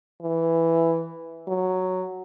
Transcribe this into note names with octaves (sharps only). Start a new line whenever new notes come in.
E3
F#3